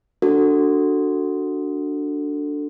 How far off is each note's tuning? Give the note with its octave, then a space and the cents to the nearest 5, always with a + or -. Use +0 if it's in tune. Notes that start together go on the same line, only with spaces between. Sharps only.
D4 +0 F#4 +0 A4 +20